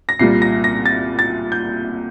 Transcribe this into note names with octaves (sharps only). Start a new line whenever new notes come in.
A#6
C2 A#2 G3 C7
A#6
A#6
A6
A6
G6